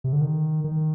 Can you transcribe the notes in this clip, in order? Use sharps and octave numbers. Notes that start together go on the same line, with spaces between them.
C3
D3
D#3
D#3